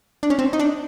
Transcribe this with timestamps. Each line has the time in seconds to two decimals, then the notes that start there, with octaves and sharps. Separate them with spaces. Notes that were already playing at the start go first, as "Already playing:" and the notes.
0.23 D4
0.30 C#4
0.39 C4
0.53 D#4
0.59 D4